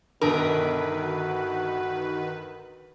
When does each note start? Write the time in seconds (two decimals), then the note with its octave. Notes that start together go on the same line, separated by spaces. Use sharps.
0.21 G1 G2 B2 D#3 A#4 B4
1.04 F#4